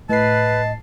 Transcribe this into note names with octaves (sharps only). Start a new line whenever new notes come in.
A2 B4 D#5 A5 C7